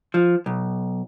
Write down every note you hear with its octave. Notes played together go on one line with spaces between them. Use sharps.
F3
B1